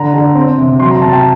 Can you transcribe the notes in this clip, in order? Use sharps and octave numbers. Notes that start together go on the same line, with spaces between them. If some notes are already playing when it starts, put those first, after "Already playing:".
Already playing: D3 A#5
D3
C4
C3
F#3 C6
A#5
C3 A5
G5